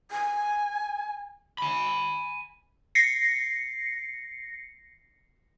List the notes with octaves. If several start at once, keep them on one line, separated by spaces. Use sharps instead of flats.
G#5
G#5 B5
A#6 C7 C#7